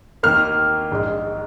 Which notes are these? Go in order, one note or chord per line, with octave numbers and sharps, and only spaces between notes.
D#2 D#3 A#3 F6
A#1 G#2 G#3